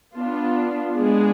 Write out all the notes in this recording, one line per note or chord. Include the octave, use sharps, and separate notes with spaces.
B3 D4 F4
G#3 B3 D4 G#4